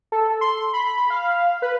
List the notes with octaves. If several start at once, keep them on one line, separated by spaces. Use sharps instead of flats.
A4
C6
B5
F5
B4